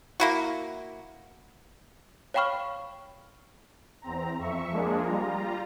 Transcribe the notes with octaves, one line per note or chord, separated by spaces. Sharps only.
A#3 E4 F#4
C#5 F5 G5 B5 C#6 F6
E2 C4 A#5
F2 E5 C#6
F3 G#3 A#3 D4 G#4
G3 F4 A#5